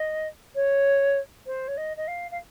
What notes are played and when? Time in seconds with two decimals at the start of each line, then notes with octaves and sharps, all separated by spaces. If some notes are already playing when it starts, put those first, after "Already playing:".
Already playing: D#5
0.55 C#5
1.46 C5
1.68 C#5
1.77 D#5
1.97 D#5
2.08 F5
2.31 F5